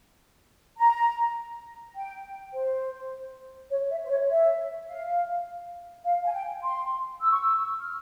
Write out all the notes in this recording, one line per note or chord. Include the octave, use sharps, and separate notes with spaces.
A#5
G5
C5
C#5
E5
C5
C#5
E5
F5
F5
G#5
G5
C6
E6
C#6
E6
F6